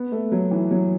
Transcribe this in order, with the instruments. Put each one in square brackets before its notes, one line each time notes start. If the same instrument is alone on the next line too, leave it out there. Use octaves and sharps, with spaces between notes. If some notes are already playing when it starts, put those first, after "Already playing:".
Already playing: [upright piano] B3
A3
F#3
E3
F#3